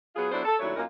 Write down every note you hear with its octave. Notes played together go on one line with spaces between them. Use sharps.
F#3 B3 F4 G#4
F#3 B3 D4 E4 A4 C5
A4
D#2 F#3 A3 D4 E4 C#5
F#2 A#3 C#4 D#4 F4 A#4